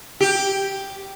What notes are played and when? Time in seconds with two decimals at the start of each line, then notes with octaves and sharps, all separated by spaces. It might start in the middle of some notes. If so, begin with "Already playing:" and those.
0.21 G4